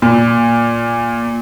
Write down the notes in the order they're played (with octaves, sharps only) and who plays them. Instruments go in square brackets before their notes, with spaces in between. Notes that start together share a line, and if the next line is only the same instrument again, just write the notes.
[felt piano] A#2